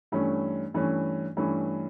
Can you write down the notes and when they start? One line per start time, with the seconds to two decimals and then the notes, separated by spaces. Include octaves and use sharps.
0.12 G2 E3 A3 C#4
0.74 G2 E3 A3 C#4
1.37 G2 E3 A3 C#4